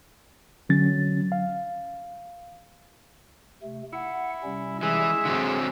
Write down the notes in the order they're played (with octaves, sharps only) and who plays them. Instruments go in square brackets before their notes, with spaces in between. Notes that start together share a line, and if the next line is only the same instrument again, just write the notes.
[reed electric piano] D3 F#3 C#4 A6
F5
[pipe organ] C3 A3
[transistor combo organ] E4 [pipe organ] F#5
[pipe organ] C3 G3 C#4
[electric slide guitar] E3 [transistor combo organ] G#3 [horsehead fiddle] E5
[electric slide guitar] D3 F#3 C4 [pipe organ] E6